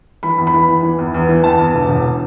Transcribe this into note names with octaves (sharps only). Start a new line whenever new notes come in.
E3 B5
E2
B5
E3
E2
E3
E2
E2
E3
E2 A5
E2
E1
E1